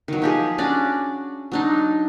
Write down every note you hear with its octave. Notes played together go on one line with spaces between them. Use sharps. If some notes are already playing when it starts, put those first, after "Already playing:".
D#3 F#3
F3 G4 G#4
C#4 D4 F#4 D5
F#3 D4 D#4